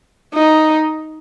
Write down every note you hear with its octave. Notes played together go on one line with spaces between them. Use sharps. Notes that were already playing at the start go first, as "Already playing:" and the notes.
D#4